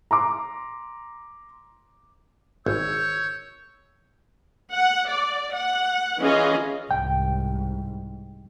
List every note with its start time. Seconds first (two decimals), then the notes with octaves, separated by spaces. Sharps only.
0.11 A#5 C6 D6
2.66 G#1 C#5 E6 G6
4.71 F#5
5.09 D5
5.54 F#5
6.20 E3 C#4 F4 G#4 D#5
6.91 C2 G#2 G5